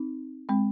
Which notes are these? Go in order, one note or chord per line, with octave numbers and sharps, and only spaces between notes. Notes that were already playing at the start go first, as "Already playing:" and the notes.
Already playing: C4 D#4
G#3 C4